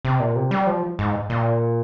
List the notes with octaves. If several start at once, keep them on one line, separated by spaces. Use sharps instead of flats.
C3
A#2
C3
G3
F3
G#2
A#2